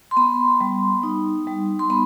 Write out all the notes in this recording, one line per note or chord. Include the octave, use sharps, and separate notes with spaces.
C6
B3 B5
G3
D#4
G3
C6
B3 B5